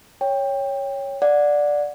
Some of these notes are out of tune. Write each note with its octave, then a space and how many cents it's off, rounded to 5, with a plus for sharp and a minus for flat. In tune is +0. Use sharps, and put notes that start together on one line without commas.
C#5 +0 G5 +15
D5 +0 F#5 -20